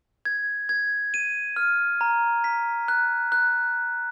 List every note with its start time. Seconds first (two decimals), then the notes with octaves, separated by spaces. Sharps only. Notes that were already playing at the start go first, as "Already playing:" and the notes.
0.25 G#6
0.69 G#6
1.14 D#7
1.56 F6
2.01 A#5
2.44 B6
2.88 F#6
3.32 F#6